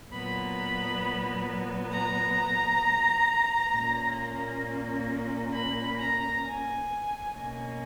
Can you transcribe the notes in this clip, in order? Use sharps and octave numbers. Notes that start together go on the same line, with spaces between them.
A#2 F#3 B3 B5
A#5
A#2 A#3 C#4
B5
A#5
G#5
B2 A#3 C#4